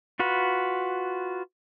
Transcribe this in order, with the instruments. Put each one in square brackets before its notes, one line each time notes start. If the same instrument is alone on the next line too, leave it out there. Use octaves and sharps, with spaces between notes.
[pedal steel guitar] F4 F#4 B4